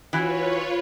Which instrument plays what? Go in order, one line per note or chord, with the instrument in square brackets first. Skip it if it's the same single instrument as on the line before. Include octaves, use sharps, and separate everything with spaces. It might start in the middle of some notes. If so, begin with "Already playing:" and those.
[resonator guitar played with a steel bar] E3 F#4 [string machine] F4 B4 C#5